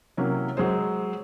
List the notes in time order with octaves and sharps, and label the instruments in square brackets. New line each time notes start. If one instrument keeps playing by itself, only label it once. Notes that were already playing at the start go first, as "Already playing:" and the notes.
[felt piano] C3 E3 F#3 A#3 C#4
F#3 G#3 G#4 C5